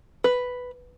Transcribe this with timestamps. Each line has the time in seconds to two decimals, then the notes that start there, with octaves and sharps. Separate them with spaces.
0.24 B4